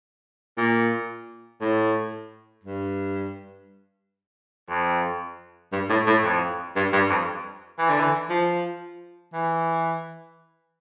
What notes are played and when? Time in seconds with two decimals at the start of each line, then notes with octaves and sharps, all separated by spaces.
0.58 A#2
1.61 A2
2.64 G2
4.70 F2
5.73 G2
5.90 A2
6.07 A2
6.24 F2
6.76 G2
6.93 G2
7.10 F2
7.79 E3
7.90 D3
8.00 E3
8.30 F3
9.33 E3